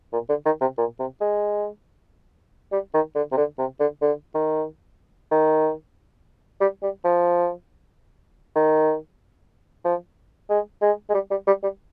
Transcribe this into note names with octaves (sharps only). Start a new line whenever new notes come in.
A#2
D3
D#3
C3
A#2
C3
G#3
G3
D#3
D3
C3
D3
C3
D3
D3
D#3
D#3
G3
G3
F3
D#3
F3
G#3
G#3
G#3
G3
G3
G3
G3